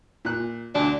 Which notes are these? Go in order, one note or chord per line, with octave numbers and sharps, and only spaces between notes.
A#2 F#6
D2 D3 D4